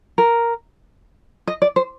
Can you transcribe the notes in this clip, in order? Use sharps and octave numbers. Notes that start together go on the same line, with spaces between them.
A#4
D#5
D5
C5